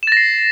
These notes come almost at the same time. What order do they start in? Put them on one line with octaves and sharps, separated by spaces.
E7 A6 A#6 C7